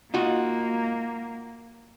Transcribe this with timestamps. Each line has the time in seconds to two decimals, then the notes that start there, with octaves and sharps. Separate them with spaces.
0.14 A#3 D#4 F4 F#4